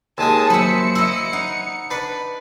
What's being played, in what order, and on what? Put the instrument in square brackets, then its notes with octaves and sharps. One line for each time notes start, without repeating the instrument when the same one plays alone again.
[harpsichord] D#2 G#3 G#5 [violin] A5 D#6
[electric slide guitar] F#3 A#3 [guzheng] C5 E5 [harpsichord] B5 [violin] C#7
[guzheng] E4 D#5 [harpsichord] E5
[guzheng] D#4 [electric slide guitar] F#5
[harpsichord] D4 B4